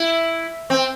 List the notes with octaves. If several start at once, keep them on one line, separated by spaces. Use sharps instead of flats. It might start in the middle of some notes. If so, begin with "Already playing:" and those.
Already playing: E4
C4